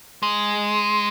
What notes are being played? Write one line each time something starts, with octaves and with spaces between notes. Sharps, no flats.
G#3